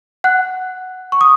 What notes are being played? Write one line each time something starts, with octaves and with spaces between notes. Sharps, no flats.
F#5 F#6
C#6
D#6